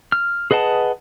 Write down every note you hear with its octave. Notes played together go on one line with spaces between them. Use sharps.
F6
G#4 B4 D#5 F#5 A5